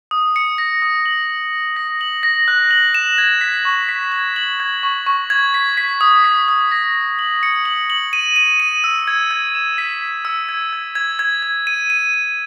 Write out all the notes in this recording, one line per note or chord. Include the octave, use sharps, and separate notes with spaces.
D#6
C#7
A#6
D#6
F#7
F#7
A#6
A#6
F#7
A#6
F#6
F#7
E7
G#6
B6
C#6
B6
G#6
F#7
G#6
C#6
C#6
G#6
B6
B6
D#6
B6
D#6
A#6
A#6
F#7
C#7
F#7
F#7
D#7
D#7
D#7
E6
G#6
G#6
E7
B6
B6
E6
G#6
G#6
G#6
G#6
G#6
D#7
D#7
D#7